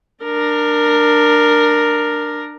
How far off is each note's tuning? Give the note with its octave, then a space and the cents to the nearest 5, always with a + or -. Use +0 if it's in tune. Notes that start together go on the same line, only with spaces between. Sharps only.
D4 +20 A#4 +0